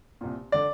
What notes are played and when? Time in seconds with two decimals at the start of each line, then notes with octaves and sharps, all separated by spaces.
0.21 C2 A#2
0.52 D3 D5